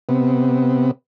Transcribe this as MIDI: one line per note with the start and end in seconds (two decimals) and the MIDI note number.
0.09 0.91 48
0.09 0.91 59